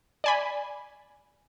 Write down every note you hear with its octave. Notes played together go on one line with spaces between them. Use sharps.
D5 G#5 B5